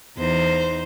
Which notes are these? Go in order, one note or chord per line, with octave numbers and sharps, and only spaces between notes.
E2 D#4 C5